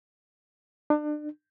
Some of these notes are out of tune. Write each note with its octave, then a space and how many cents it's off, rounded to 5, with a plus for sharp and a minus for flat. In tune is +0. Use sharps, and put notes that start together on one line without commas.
D4 +30